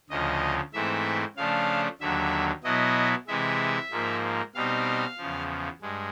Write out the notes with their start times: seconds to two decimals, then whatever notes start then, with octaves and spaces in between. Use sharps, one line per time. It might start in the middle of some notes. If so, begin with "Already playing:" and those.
0.10 D2 C#3 F3 D#5
0.73 G#2 E3 A3 C4 E5
1.37 C#3 F3 A3 D4 F5
2.01 D#2 D3 F#3 E5
2.64 B2 F#3 B3 E4 D#5
3.27 C3 E3 G#3 E5
3.91 G#2 F3 A#3
4.55 B2 G3 C4 D#4 F5
5.18 E2 C#3 F3
5.81 G2 G#3